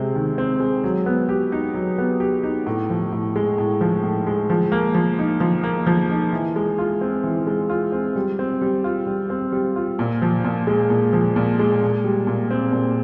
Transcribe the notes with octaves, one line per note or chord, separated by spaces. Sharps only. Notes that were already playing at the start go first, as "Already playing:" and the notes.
Already playing: C3 G#3 C4
D#3
C4
G#3
F#3
B3
G4
D#4
F#3
B3
G4
D#4
A2
F3
A2
G#3
A2
F3
A2
G#3
F3
A#3
F3
D#4
F3
A#3
F3
D#4
E3
G#3
F4
C4
E3
G#3
F4
C4
G3
C4
G3
F4
G3
C4
G3
F4
A#2
F3
A#2
G#3
A#2
F3
A#2
G#3
A#2
G3
A#2
C4
A#2